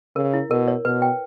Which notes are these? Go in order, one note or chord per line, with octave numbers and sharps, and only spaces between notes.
C#3 A#4
E4
B2 A#4
C#5
B2 B4
G5